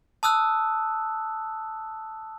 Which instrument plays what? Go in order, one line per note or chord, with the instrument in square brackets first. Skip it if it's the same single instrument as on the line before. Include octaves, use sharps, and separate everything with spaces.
[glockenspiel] A5 D#6 E6 F#6